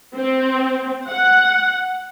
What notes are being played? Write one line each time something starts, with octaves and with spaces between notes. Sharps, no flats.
C4
F#5